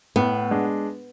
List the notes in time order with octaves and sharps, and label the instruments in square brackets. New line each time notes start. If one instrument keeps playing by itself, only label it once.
[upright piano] A2 [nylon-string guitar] B3
[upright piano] G#3 D4